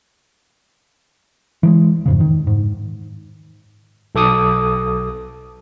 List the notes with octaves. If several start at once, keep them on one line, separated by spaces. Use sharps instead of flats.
E3 F3 G#3
F2 G#2 C#3
D#3
G#2
B1 A4 D6 D#6